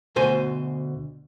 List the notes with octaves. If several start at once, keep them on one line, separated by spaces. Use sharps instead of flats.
D2 B2 C5 G#5